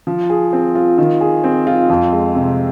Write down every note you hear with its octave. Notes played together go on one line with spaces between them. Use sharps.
F3
G#4
C4
F4
D#3
G#4
C4
F4
F2
G#3
C3